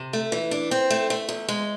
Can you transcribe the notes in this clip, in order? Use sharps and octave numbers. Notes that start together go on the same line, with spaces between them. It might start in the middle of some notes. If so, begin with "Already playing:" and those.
Already playing: C3
A3
E3
D4
C4
A3
A3
E2
G#3